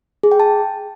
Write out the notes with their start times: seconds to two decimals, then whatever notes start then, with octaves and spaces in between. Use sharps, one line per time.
0.23 G#4
0.32 G5
0.40 A5